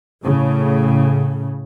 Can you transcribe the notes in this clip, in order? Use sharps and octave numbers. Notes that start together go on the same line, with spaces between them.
A2 C#3